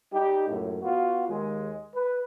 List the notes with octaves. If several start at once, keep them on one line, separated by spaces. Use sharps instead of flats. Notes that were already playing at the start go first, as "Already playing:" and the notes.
G3 D#4 G4
C#2 F#2 A2
B3 F4 F#4
D#2 G#3
B4